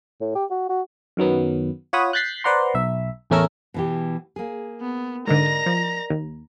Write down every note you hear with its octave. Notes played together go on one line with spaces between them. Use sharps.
A2
G4
F#4
F#4
F#2 D#3 F#3 B3
F4 C#5 F#5 B5 D#6
F#6 G6 A6 B6 C7
B4 C5 D5 F#5 A#5 C6
B1 E5
A1 E2 A3 C#4 A#4 E6
B2 E3 G4
A#3 G#4
B3
G#2 D3 A#4 D5 D#5 A#5 A#6
F3
D#2